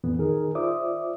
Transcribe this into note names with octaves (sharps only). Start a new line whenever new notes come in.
F2 A#2 E3 B3
D#3 D#4 G#4 A#4
F4 C5 D5 E5 D6 D#6